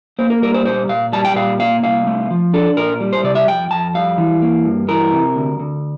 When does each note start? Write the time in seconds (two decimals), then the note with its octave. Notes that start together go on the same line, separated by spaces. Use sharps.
0.19 A#3 C5
0.30 A#4
0.42 G3 A#4
0.54 C5
0.65 A#2 C5
0.89 A#2 F5
1.13 G3 A5
1.25 G5
1.36 A#2 F5
1.59 A#3 F5
1.83 C2 F5
2.07 A3
2.31 F3
2.53 D4 A4
2.77 A#2 A#4
3.00 G3
3.13 C5
3.24 C3 D5
3.35 E5
3.48 F2 G5
3.71 F2 A5
3.94 G3 F5
4.18 E3
4.42 A#3
4.65 G2
4.88 E3 A#4
5.12 C3
5.36 D2
5.59 D2